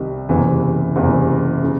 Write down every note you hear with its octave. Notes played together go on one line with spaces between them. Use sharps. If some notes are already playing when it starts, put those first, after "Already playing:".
Already playing: C2 C3 D#3
F#1 E2 C3 E3
F#1 E2 C3 E3
C#3